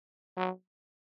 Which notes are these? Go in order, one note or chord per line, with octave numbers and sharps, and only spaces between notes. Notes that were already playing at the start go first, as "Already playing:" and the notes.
F#3